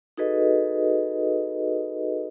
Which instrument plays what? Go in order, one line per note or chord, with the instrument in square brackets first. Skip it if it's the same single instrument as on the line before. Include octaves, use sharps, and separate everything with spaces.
[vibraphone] D#4 F#4 G#4 A4 B4 D#5